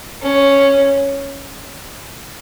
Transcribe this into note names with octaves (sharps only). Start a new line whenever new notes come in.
C#4